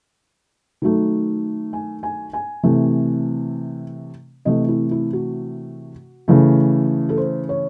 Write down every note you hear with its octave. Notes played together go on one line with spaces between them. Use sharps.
D#3 F#3 A3
G#5
G#5
G#5
C3 E3 A3
C3 E3 A3 D#5
E4
E4
F#4
C#3 E3 A3
A4
C5
C#5